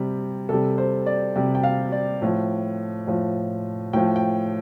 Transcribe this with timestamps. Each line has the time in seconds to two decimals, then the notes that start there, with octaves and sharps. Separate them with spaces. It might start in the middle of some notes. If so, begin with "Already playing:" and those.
Already playing: C3 G3
0.49 C3 G3 A4
0.78 C5
1.06 D5
1.36 C3 G3 G5
1.55 G5
1.63 F5
1.92 D5
2.22 A2 F3
3.07 A2 F3
3.93 A2 F3 G5
4.16 G5